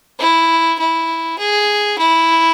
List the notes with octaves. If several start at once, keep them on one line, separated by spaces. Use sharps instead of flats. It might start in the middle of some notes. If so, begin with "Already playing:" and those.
E4
E4
G#4
E4